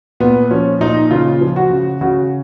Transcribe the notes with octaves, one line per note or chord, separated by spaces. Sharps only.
A#2 B3
F3 C#4
A#2 D#4
C#3 F4
F3
F#4
C#3
C#3 F#4